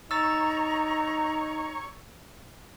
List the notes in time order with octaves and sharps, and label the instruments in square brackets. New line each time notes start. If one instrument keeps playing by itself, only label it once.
[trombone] D#4 [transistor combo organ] C#5 [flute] A#5 [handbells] E6 A6